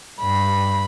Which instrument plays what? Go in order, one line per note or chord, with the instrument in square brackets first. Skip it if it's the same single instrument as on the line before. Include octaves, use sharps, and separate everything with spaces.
[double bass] G2 [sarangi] B5